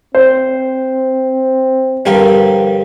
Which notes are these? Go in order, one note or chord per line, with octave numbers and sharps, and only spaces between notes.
C4 C5
G2 D3 F3 G3 A#4 G#5